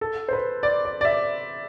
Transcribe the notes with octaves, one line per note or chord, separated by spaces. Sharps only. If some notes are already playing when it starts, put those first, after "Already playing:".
A4
C5
B4
D5
D5
D5
E5